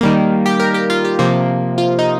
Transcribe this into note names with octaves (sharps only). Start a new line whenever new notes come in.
D#3 G3 A#3
G4
A#4
G4
F4
G4
C3 F3 A#3
F4
D#4